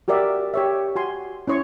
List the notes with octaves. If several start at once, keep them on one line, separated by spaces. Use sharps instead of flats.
F#4 G4 A#4 D5 E5
G4 C#5 E5
F#4 G#5 C6
C#4 E4 C#5 C6 C#6